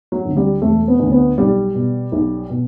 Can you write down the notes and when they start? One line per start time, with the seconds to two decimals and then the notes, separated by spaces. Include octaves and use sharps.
0.12 F#3
0.25 D2 D3
0.37 G3
0.62 E1 A3
0.88 B3
1.00 D2 D3
1.12 B3
1.38 B1 G3
1.75 B2
2.12 B1
2.50 B2